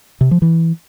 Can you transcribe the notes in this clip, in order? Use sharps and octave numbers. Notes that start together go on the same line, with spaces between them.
C3
F3
E3